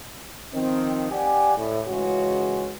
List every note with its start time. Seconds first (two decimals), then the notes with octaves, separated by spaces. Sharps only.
0.54 D#3 F3 C4
1.11 G4 D5 F#5 G#5
1.56 A2
1.87 C#2 C#3 E3 G#3 F#4 C#5